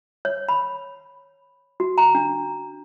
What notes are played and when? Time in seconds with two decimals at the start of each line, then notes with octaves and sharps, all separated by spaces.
0.25 C#5
0.49 B5
1.80 F#4
1.98 A#5
2.15 D4